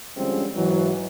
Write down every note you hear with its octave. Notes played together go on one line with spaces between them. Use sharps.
D3 F3 G3 G#3 C4 C#4
G#2 E3 F#3